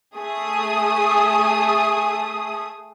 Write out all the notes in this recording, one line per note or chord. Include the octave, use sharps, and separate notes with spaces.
A3 G#4 D#6